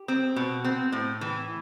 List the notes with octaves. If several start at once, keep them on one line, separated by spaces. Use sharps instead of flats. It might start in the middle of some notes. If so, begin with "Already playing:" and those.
Already playing: G4
C4
B2
C4
A2
E3